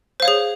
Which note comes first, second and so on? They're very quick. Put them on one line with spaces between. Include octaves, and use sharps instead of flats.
C5 F5 C#5 G#4